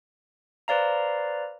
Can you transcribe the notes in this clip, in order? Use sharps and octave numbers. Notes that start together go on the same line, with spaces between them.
B4 C5 D5 F5 A#5